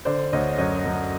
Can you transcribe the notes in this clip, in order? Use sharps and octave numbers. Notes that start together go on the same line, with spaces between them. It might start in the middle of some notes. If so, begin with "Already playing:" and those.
D3 C5 D5
D2 C#5 D#5
F#2 C#5 D#5
F#2